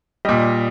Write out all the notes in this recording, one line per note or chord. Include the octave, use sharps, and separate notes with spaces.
A#2 G3 D#5